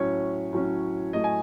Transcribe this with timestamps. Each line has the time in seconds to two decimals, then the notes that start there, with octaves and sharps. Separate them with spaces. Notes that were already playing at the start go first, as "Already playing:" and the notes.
Already playing: A2 F#3 C#4 C#5
0.53 A2 F#3 C#4
1.13 A2 F#3 A3 D#5
1.24 G#5